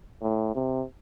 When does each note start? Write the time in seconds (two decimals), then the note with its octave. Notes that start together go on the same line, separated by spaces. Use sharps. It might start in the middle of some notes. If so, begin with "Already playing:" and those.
0.22 A2
0.55 C3